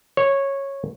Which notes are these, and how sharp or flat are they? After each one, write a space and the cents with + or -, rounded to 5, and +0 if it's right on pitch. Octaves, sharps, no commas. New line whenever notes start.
C#5 -10